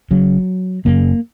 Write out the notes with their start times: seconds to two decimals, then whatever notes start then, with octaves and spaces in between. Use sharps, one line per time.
0.11 F#1 F#2 C#3 F#3
0.85 F#1 F#2 C#3 A#3